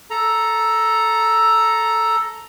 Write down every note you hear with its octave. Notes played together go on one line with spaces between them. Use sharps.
A4 A#5